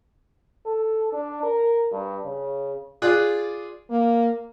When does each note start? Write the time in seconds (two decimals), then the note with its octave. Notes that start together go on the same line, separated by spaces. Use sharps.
0.66 A4
1.12 D4
1.43 A#4
1.91 G2
2.24 C#3
3.02 F4 G#4 D5 F#6
3.90 A#3